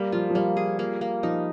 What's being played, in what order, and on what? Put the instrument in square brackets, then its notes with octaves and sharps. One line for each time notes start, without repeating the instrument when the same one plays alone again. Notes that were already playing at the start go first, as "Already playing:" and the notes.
Already playing: [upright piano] G3 [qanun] A#3
[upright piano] F3 [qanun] F4
[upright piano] F3
[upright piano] G3 [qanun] A#3
[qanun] G#4
A#3
A#3
[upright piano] F3 [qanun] D#4